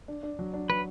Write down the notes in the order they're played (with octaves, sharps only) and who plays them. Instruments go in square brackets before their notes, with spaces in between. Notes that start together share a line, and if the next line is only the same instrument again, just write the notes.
[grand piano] D4
D4
F#3
D4
[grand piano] F#3 [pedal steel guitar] B4